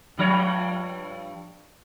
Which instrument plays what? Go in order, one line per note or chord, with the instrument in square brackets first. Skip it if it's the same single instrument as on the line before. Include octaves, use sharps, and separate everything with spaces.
[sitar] G2 F3 C#5